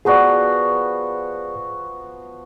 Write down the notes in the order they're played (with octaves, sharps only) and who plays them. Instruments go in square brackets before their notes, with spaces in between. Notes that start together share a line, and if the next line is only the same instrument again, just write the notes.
[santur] F3 B3 F#4 [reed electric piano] G#4 D5